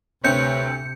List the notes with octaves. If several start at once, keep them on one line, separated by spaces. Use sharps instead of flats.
D2 C3 C4 B4 C#5 G6 C#7